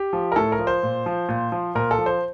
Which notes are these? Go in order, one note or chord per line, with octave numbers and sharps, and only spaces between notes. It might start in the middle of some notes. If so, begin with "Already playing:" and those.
Already playing: G4
F3
A#4
A2 A4
A#4
F3
C5
A#2
F3
A#2
F3
A#2 A#4
A4
F3
C5